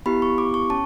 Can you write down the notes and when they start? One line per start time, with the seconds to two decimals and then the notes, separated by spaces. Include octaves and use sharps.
0.06 B3 E4 G4 B5
0.22 C#6
0.38 D6
0.54 C#6
0.70 C#4 A5